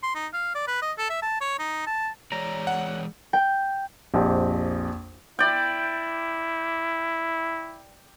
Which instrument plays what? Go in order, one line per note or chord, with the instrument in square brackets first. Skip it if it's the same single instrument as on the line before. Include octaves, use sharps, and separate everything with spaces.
[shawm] C6
D#4
F5
D5
B4
D#5
A4
E5
A5
C#5
D#4
A5
[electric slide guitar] E3 G#3 D5 [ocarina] C#5 [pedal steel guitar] A#5
[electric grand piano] F#5
[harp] G5
[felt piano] A#1 F2 G4
[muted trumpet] E4 [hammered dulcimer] D5 G5